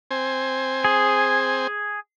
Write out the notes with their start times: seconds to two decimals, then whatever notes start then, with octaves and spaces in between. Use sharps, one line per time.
0.11 C4 C5 G#5
0.84 G#4